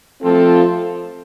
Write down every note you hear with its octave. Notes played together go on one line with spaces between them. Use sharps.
F3 A3 C4 F4 A4